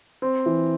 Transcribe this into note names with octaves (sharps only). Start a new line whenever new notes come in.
C4
E3